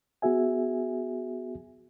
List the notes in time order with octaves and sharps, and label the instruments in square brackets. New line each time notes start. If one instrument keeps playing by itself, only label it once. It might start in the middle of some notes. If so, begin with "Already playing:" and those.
[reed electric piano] B3 F#4 G#4 E5 G#5